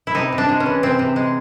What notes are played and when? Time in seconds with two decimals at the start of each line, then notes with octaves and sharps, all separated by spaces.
0.07 E4
0.15 C3 D#4
0.32 C3
0.38 D4
0.49 G#3
0.60 C#4
0.66 E3
0.83 C3 C4
0.99 C3
1.16 G#3